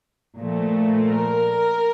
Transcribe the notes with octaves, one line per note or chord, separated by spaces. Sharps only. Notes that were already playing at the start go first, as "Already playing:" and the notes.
A#2 F3 A3
A#4